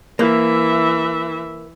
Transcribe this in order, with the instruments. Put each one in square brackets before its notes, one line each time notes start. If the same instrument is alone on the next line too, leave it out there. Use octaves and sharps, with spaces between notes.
[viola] E3 E5 [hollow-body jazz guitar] A#3